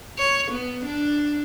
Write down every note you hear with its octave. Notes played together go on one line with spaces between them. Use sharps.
C#5
B3
D4